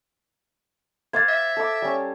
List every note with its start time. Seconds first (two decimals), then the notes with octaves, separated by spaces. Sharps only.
1.13 C5 F5 D6 G#6 A6
1.29 E5
1.57 A4 D6
1.82 G3 C#4